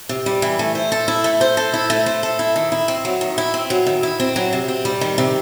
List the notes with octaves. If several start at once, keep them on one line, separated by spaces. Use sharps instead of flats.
C3
G3
E3
A3
C5
A4
E4
A3
C5
A4
E4
A3
C5
A4
E4
D#3
E4
C4
F#3
D#3
E4
C4
F#3
D#3
E4
C4
F#3
C3
C4
G3
D#3
C3